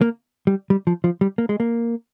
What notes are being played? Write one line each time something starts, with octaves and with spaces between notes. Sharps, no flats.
A#3
G3
G3
F3
F3
G3
A#3
G#3
A#3